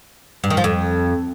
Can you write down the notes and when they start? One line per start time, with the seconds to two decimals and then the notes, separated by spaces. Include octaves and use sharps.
0.44 G2
0.50 D#3
0.57 F3
0.64 F2